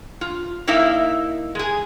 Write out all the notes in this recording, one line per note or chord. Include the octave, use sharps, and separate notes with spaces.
F4
A#3 D#4 E4 E5 F5
G#3 G#4